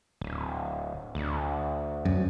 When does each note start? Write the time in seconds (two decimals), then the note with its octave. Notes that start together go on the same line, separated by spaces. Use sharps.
0.21 D1
1.15 D2
2.05 F#2